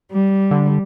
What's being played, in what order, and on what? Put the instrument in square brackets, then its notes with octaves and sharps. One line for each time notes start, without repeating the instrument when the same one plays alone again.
[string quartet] G3
[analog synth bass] D3